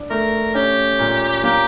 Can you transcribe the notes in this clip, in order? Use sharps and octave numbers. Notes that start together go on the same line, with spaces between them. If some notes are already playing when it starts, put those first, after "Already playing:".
Already playing: D4
A3 A#4
C#4 G4
A#2
A#3 G4